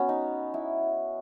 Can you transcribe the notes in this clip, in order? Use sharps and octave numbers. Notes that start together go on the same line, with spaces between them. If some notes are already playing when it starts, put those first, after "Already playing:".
Already playing: B3 C#4 F#4
D#4
E4